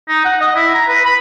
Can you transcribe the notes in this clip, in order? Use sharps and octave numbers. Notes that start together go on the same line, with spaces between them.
D#4
F#5
D#5
E4
A#5
B4
B5